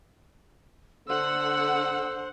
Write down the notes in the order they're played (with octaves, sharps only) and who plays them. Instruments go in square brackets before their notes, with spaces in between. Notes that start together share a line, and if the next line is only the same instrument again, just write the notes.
[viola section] D3 F#5 [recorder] C5 [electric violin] E6